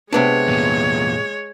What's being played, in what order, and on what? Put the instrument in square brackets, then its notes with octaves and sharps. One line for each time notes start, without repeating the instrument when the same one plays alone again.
[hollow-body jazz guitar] C3 B3 D4 [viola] G#3 C#5
[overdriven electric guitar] E2 A#2